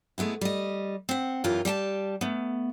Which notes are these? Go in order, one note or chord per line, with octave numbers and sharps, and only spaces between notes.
G#3 A3 B3 E4
G3 D#5
C4 F#5
F#2 C3 E3 F4 G4
G3 G4 G5 A5
A3 B3